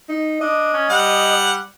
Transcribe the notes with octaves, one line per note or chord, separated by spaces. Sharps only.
D#4
D4 D#5
C#4
G3 F#5